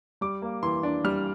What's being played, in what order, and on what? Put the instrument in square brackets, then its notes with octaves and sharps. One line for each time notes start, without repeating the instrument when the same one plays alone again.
[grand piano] G3 D6
A#3
E3 C6
D4
G3 F6